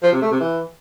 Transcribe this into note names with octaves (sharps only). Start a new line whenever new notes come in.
F3
C3
A3
C3
E3